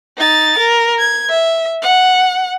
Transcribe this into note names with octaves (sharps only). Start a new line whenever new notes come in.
D#4 A6
A#4
G#6
E5
F#5